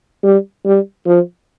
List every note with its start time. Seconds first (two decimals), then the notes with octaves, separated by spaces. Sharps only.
0.23 G3
0.65 G3
1.06 F3